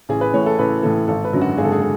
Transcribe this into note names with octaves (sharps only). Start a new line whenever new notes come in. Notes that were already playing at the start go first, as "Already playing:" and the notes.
A1 G#4
B4
A2 E3 C#5
A4
A1 B4
A2 E3 A4
G#1 A4
B4
F#2 D3 F#3
F#4
G#1 G#4
A4
G#4
A4